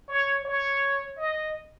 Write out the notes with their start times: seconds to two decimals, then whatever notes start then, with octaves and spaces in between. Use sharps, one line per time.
0.09 C#5
0.45 C#5
1.17 D#5